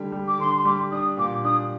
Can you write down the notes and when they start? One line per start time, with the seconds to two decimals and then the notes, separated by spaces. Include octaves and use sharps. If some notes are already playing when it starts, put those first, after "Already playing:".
Already playing: D3 G3
0.12 G3
0.28 D6
0.39 D3 C6
0.57 C6
0.65 G3 D6
0.91 D4 D#6
1.17 A#2 D6
1.44 D4 D#6